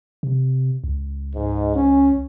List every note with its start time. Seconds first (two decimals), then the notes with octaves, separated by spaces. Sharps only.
0.23 C3
0.84 C#2
1.35 G#2
1.75 C#4